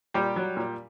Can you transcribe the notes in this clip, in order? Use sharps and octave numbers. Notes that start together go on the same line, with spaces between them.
A#2 G3 G4
F#3
A#2